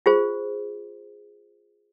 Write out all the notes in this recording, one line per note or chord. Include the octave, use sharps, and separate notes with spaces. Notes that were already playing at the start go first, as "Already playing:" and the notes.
F4 G#4 C5